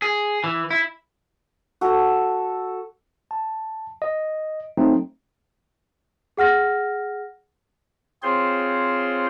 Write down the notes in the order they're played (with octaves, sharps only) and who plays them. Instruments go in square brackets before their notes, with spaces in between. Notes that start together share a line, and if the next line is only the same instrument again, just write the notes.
[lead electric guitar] G#4
E3
E4
[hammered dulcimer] F#4 A4
[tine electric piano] A5
D#5
F#3 A3 C4 D#4
[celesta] G#4 F#5 F6 A#6
[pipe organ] C4 F4 G#4 C5 C#5 C6